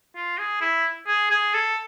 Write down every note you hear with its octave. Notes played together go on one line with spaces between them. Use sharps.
F4
G#4
E4
G#4
G#4
A4